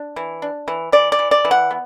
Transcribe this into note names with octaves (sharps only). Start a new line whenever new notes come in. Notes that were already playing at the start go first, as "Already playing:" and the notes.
Already playing: D4
E3
D4
E3
E3 D5
D5
E3
D5
E3
F#5
B3